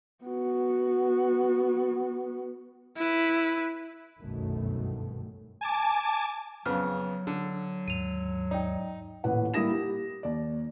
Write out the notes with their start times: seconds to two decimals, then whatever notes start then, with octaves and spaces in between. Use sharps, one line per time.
0.24 B3 F#4
2.97 E4 B4
4.20 G1 C2 F#2 B2 D#3 A3
5.61 G#5 A5 D6
6.66 F2 C#3 F#3 B3 F6
7.27 D3
7.88 D#2 G#2 D#7 F7
8.51 D#4 D5 G5
9.24 D#1 A1 B4 F#5
9.54 G3 A#3 E4 D#6 A#6 E7
9.70 G4
10.23 D#2 D5